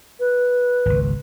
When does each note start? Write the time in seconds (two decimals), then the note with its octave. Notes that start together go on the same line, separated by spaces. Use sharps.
0.19 B4
0.86 G#1 C#2